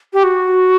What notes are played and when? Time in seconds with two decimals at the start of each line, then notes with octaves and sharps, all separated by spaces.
0.13 G4
0.24 F#4